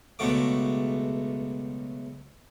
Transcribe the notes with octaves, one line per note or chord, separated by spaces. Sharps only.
C#2 B2 F#3 A3 D6